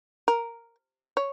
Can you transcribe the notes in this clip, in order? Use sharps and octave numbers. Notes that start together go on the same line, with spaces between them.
A#4
C#5